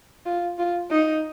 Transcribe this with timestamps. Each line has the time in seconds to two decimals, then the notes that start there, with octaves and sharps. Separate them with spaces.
0.26 F4
0.59 F4
0.91 D#4